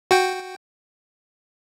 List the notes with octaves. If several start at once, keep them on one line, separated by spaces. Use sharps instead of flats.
F#4 G5